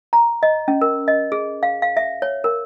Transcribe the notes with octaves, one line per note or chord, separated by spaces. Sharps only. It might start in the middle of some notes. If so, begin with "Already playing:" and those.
A#5
D#5
C#4
A#4
D#5
G#4
F5
F5
E5
C#5
A#4